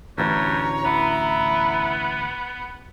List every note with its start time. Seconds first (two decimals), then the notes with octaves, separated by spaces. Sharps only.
0.18 A1 D2 G2 E3 C#5 A#5
0.85 B3 E4